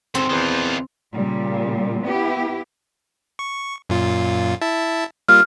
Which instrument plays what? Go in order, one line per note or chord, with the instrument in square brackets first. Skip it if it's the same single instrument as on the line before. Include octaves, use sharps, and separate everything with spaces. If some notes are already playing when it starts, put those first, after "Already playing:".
[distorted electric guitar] D2 G#2 [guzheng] C4
[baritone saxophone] E2 [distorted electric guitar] D#3 F4
[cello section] A#2 C#3 G3
B3 E4 G4
[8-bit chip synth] C#6
F#2 A#2 F4
E4 E5 A5
[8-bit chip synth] G3 A#3 F4 [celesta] F6